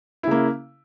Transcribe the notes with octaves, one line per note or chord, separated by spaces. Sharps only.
C#3 A#3 E4